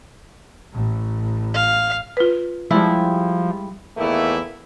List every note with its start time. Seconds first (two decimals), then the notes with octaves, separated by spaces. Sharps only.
0.72 A1 A2
1.54 F5
2.17 F4 B4
2.71 F3 G3 G#3 E4
3.97 E2 D#3 E3 A3 A#3 E4